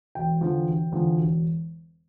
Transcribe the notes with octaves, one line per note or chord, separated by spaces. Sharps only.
E1 G5
E2 D3 F3
E1
E2 D3 F3
E1